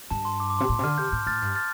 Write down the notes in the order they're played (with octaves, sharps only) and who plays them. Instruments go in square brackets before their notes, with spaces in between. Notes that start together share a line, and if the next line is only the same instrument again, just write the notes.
[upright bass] G2 [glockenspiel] A5
[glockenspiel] C6
D6
D6
[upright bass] C3 [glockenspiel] C6
[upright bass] A2 [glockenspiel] D6
[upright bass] C3
[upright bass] D3 [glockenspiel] F6
[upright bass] C3 [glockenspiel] G6
[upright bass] A2 [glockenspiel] G6
[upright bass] A2 [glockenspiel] F6 A6
[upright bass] G2
[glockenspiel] F6 A6